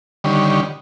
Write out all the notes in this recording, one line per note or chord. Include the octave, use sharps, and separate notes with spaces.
D3 D#3 G3 C#4